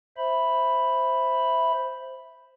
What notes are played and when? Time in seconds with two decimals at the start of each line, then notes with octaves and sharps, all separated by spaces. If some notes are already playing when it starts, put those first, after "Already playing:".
0.17 C5 E5 B5